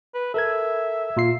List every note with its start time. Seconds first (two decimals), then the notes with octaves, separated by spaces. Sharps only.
0.14 B4
0.34 A4 A#4 E5 G#6
1.17 A#2 F4 C7